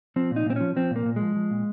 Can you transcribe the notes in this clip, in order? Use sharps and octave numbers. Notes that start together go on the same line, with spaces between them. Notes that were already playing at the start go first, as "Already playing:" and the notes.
F3 C4
A#2
D#4
A#2 C4
F3 C#4
F3 C4
A#2
A#3
A#2
F3 G#3
F3
A#2